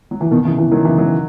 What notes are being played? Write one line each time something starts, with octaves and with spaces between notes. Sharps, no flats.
F#3
E3
B2 D#3
C#3 E3
C#3 E3
D#3 F#3
C#3 E3
D#3 F#3